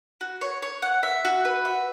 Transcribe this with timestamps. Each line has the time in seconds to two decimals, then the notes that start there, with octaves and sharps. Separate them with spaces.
0.21 F#4
0.41 C#5
0.62 C#5
0.82 F#5
1.03 E5
1.25 F#4
1.45 B4
1.65 E5